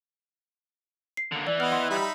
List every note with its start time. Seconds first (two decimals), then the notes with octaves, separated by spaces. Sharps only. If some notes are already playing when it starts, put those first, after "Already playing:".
1.17 C7
1.32 D3 A#3
1.47 E3 D5
1.60 B3 D#5 B5 F6
1.72 F#5 C6 D#6
1.90 G3 D#4 E5 B5